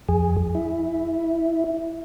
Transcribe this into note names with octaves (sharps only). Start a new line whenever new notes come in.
F2 G#4
E4